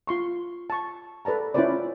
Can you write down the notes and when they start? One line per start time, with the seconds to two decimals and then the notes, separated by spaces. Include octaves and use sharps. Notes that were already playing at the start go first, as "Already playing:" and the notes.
0.07 F4 C6 C#6
0.70 A5 C#6
1.25 A4 B4 D5 A5 A#5
1.54 C#4 E4 F4 B4 C5 D5